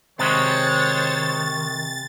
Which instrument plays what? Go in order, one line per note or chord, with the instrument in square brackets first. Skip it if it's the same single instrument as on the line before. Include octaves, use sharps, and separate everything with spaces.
[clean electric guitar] C3 G#3 F#4 [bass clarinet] D#3 [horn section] C5 C#5 [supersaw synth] A6